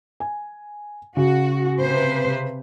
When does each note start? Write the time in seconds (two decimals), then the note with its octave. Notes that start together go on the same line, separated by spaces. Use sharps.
0.20 G#5
1.17 C#3 F#4
1.81 C3 B4 C5